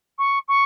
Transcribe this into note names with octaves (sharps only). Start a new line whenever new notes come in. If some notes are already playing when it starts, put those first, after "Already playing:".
C#6
C#6